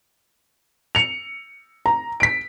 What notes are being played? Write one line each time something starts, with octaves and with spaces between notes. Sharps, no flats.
C#7 F7
A#5
B6 D7